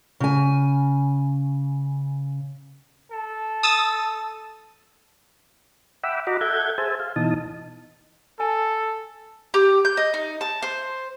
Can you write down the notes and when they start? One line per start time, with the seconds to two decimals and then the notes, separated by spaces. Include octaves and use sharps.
0.20 C#3 G#5
3.11 A4
3.63 D#6 E6 A6
6.03 E5 F#5 G5 B5 D6 E6
6.27 F#4 D#5 F#5 A#5 B5 D6
6.41 A4 E5 F#5 G6 G#6
6.78 G#4 C5 E5 G#5 A5
7.00 F5
7.16 B2 E3 D#4 A5 D#6
8.40 A4 G#5 A5
9.54 G4
9.85 G6
9.97 D#5
10.14 D#4
10.41 A5
10.62 C5